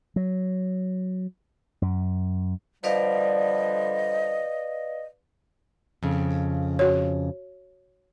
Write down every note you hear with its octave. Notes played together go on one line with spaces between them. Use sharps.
F#3
F#2
D3 F3 G3 B4 D5 D#5 F5
F2 C#3
F#4 C#5